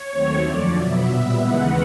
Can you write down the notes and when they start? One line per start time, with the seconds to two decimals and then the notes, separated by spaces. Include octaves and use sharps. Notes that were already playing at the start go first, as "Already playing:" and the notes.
Already playing: C#5
0.10 D#2 D#3 F#3 A3 C4
0.42 F2 D3 F3 D5
0.73 B2 F#3 B3 E5
1.06 A#2 G3 B3
1.37 D#2 C#3 E3 G#3 B3 F#5